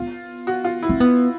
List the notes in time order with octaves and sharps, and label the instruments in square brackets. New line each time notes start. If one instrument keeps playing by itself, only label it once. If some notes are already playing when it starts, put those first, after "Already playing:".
Already playing: [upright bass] B3 [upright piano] F4
[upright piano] F#4
F4
E4
[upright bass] C4
B3